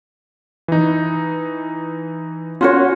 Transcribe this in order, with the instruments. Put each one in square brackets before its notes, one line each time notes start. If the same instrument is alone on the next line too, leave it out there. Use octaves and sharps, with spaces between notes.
[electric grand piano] E3 D#4
[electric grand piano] C#4 [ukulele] F4 F#4 C#5